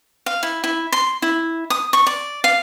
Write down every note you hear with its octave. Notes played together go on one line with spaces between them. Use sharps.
F5
E4
E4
C6
E4
D#6
C#6
D5
F5